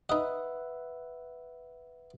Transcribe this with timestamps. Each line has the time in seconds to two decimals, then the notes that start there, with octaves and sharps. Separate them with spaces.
0.09 D#4 B4 D#5 E5 F#5